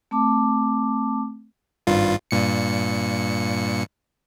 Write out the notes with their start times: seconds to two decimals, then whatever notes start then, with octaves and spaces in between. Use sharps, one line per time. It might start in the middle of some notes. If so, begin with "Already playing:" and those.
0.11 A3 C4 A5 D6
1.87 G#1 G2 F4
2.31 G2 A#2 C#7